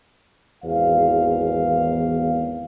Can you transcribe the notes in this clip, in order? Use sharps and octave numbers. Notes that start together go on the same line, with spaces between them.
G#1 E2 F5